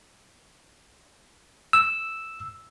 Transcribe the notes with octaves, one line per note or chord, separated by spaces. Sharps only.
E6